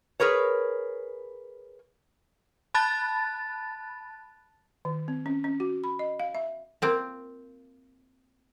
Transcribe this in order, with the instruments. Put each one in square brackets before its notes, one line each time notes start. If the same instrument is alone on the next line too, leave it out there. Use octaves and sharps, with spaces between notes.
[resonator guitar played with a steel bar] G#4 A#4 B4 C#5
[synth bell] A5 B5 F#6 A6
[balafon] D#3
C4
C#4
C#4
F#4
B5
D#5
F5
E5
[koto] A#3 C4 F4